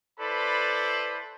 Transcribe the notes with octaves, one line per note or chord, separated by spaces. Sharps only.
E4 A4 B4 C5 D5 B5